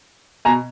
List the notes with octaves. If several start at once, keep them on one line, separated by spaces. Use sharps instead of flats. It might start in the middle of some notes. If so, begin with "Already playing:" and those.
B2 G#5 A#5